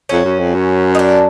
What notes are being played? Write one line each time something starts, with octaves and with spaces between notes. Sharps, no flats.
F2 C#4
F#2
F2
F#2
D#4
D4